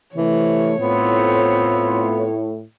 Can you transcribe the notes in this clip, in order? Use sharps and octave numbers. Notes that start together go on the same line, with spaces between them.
C3 E3 A3 C#5
A2 B3 C4 F4